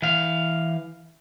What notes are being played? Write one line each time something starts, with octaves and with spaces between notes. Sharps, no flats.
E3 F5